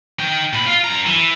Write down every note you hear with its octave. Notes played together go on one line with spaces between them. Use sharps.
D#4 G5
A#2 B5
F4 F5
F#2 A#5
E3